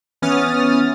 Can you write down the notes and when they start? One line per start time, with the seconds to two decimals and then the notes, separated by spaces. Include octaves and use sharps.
0.22 E3 B3 C#4 D#6 F6 A6